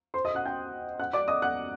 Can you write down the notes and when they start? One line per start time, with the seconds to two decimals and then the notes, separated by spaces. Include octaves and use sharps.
0.14 C5 C6
0.25 D#5 D#6
0.35 F#5 F#6
0.45 G5 G6
0.99 F#5 F#6
1.13 D5 D6
1.28 D#5 D#6
1.42 F#5 F#6